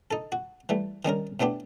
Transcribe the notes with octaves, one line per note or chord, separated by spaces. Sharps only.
D#4 A4
F#4
E3 G3 A3
D#3 G3 C#4 A#4
A2 A3 B3 D4 G4